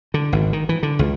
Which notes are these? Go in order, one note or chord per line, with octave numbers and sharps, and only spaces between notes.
D3
G#1
D#3
E3
D3
C#2